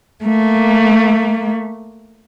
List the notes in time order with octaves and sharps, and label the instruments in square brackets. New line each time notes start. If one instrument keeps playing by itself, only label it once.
[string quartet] A3 A#3